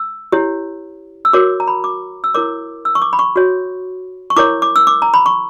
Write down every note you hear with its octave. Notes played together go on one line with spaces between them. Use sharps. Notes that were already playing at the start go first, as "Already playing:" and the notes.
Already playing: E6
E4 G4 C#5
E6
F#4 A#4 C#5 D6
A#5
B5
D6
E6
E4 A#4 C#5 D6
E6
C#6
D6
B5
C#6
F#4 C#5
C#6
E4 A#4 C#5 D6
D6
E6
D6
A#5
B5
C#6